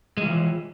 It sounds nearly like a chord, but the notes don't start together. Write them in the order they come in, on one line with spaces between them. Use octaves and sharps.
G#3 F3 E3